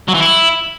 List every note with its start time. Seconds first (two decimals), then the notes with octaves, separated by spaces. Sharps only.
0.08 F#3
0.15 E3
0.21 E4